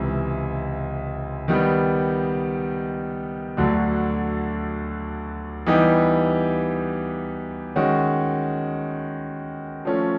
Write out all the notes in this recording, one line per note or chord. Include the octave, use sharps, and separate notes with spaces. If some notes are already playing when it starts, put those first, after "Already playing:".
Already playing: C#2 C3 E3
D#3 G3 B3
D2 D3 F#3 A3 D4
E3 G3 B3 D#4 G4
D#3 G#3 C#4 F#4
F3 A3 C#4